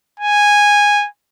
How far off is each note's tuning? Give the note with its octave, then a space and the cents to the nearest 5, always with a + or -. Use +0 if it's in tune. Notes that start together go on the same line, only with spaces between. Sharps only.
G#5 -10